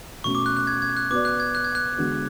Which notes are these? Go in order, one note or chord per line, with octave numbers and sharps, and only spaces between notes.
B2 A3 C#4 F#4 C#6
D6
F#6
F#6
G#6
G#6
F#6
B3 F#4 B4 D5 D6
F#6
G#6
F#6
G#6
F#6
D3 G#3 B3 F#4 B4